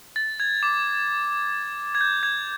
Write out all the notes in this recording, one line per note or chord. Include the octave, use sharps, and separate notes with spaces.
A6
G#6
D6
G#6
G6
G#6